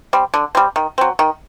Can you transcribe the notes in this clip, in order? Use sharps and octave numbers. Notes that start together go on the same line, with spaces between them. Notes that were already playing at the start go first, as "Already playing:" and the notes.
G3 C4
D3
G3 C4
D#3
F#3 C4
D#3